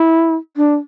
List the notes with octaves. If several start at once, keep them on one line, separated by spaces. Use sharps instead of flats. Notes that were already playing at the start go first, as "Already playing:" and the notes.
Already playing: E4
D4